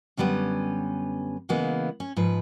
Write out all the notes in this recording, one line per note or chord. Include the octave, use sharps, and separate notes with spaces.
F#2 D3 G3 B3 C#4
C#3 E3 G#3 A#3 B3
C#4
G#2 F3 B4